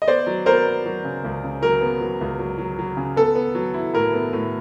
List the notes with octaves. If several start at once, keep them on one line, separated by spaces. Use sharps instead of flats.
D#5
B3 C5 D5
F#3
B3 A#4 C5
B3
F#3
C#3
C#2
C#3
F#3 A#4
B3
F#3
C#2
F#3
F#3
F#3
C#3
B3 A4
B3
F#3
E4
A2 A#4
B3
A2